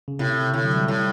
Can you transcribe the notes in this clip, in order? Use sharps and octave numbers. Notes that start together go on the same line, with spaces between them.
C#3
A2 C3
A2 D3
F#3
G3
A2